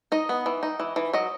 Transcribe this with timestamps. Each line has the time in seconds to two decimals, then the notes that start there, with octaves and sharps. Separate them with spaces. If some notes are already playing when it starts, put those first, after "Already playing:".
0.12 D#4 D#5
0.29 B3
0.46 E3
0.63 D#4
0.80 E3
0.96 E3
1.13 F#3 D#5